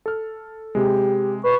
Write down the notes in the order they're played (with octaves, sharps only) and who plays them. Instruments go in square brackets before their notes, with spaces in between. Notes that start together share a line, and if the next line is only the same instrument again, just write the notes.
[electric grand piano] A4 F6
[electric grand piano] C3 G#3 [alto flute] G4
[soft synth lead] B4 [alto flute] C#6